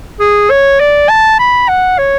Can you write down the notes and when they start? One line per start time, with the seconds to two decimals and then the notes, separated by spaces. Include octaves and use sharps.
0.20 G#4
0.50 C#5
0.80 D5
1.09 A5
1.39 B5
1.68 F#5
1.98 C#5